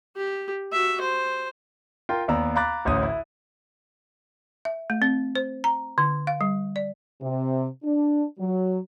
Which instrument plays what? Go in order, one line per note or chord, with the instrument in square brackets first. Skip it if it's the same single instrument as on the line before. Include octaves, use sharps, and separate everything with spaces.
[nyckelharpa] G4
F#4 E5
C5
[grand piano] F4 A#4 G5 C6
D#2 B3 D5 A#5 E6
F5 A#5 B5 D6 F#6 A6
A1 D2 C#4 D#6
E4
[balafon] E5
A3
C4
C5
A#5
D3
F5
G3
D5
[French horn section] C3
D4
F#3